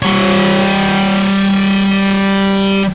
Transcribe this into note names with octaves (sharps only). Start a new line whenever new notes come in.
G3 C#5